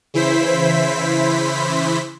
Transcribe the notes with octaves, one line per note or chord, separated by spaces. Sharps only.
C#3 E3 E4 C5 B6